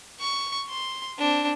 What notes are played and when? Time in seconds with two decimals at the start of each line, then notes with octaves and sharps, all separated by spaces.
0.20 C#6
0.69 C6
1.18 C4 D4